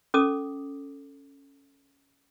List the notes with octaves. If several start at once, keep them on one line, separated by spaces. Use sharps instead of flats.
C#4 A4 D6 D#6